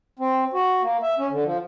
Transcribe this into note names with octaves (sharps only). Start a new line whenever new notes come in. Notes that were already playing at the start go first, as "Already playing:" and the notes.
C4
F#4
A#3
E5
C#4
D3
F3